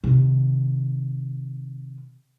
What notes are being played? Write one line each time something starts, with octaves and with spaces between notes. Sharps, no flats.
C3 D#3